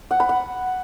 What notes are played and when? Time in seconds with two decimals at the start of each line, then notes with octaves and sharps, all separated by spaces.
0.11 F#5
0.20 B5
0.29 F#5